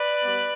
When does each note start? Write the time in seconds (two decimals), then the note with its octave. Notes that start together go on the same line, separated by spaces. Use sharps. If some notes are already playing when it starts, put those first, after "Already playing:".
Already playing: B4 D5
0.23 G3 B3